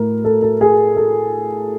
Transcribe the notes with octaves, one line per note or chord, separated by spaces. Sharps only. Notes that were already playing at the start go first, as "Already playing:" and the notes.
Already playing: A2 A#4
A4
A4
G#4
A4